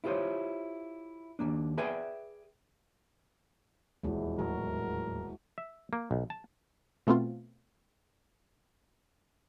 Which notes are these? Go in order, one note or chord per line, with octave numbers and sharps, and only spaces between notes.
E4 F4 G4 C5 C#5
D#2 B2 A#3 D4
G#4 B4 D5 E5 G5 G#5
D#1 E2 G#3 E4 F#4
A2 F#3 G#3 F#4 A#4
E5
A#3
B1
A5
B2 A3 B3 C4 F4